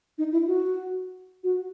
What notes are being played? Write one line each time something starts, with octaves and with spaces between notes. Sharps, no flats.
D#4
E4
F#4
F#4